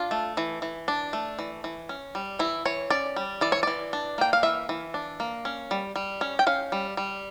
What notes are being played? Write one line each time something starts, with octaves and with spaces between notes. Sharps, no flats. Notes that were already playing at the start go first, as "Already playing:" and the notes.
Already playing: D4 F4
A3
E3
E3
D4
A3
E3
E3
C#4
G3
E3 E4
E3 C#5
C#4 D5
G3
E3 D5
C#5
E3 D5
D4
A#3 G5
F5
E3 E5
E3
D4
A#3
C#4
G3
G3
C#4
G5
C#4 F5
G3
G3